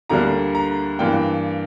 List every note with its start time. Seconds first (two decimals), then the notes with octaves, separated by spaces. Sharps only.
0.09 D2 D3 G3 A#3 D4 A#5
0.55 A#5
0.99 G2 E3 A#3 D4 G5